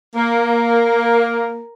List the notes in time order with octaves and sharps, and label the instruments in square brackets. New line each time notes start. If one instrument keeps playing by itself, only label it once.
[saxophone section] A#3 [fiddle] A#4